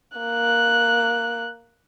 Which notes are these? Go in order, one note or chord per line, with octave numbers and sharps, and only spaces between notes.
A#3 F#6